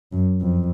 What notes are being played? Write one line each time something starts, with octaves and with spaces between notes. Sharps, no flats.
F#2
F2